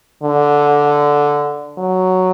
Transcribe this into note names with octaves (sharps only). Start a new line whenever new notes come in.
D3
F#3